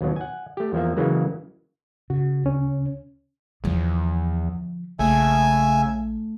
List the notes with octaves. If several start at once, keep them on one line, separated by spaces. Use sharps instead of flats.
D#2 B2 F#3
F#5 G#5
A3 G4
E2 F3 A#3 E5
C#3 E3 F#3 G#3 A#3
C#3 F#4
D2 C#4
E2 D3 F3
A#1 C#3 A3 E5 G#5